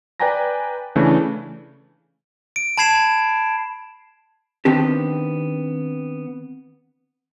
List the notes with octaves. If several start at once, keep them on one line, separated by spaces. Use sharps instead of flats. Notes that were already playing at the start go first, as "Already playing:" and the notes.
B4 D5 G5 G#5 A#5 A#6
C#3 E3 A3 D4
D7
A5 B5 G#6 C7 E7
D#3 B3 C4 D4 G4